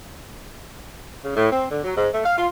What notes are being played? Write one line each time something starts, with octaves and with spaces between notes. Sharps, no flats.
C#3
A2
C4
D3
F#3
G#2
A3
F5
F4